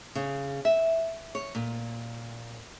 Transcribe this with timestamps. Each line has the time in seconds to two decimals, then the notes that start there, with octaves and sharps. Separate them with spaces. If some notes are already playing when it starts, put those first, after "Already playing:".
0.15 C#3
0.65 E5
1.35 C#5
1.55 A#2